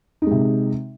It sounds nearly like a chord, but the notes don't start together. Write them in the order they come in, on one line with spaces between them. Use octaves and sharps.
D#4 G#3 C3